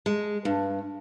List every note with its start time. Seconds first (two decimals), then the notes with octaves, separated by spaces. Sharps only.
0.06 G#3
0.45 G2